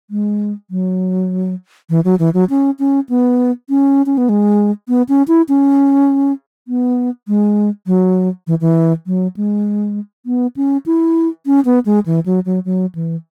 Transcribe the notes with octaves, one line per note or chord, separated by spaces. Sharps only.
G#3
F#3
E3
F#3
E3
F#3
C#4
C#4
B3
C#4
C#4
B3
G#3
B3
C#4
E4
C#4
B3
G#3
F#3
E3
E3
F#3
G#3
B3
C#4
E4
C#4
B3
G#3
E3
F#3
F#3
F#3
E3